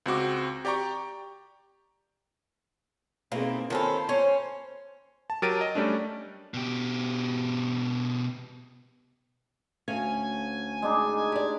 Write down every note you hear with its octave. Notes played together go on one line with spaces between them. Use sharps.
C#2 C4 F#4 D6
G4 D5 G5 A#5 C#6
B2 A#3 C4 D#4 E4 G#4 F5
D#3 C#4 F4 A4 C5 A5 B5
C#4 C#5
A5
F#3 G4 A#4 A6 D7 D#7
D#5
G3 A3 C#4 D4
B2 G4
D2 C#4 F5 G#5
G#3 D4 D#4
G4 D5